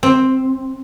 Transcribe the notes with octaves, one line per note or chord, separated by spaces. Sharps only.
C4